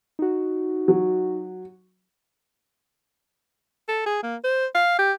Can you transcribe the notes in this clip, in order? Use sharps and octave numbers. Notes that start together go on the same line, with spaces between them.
D#4 F#4
F#3
A4
G#4
A#3
C5
F5
G4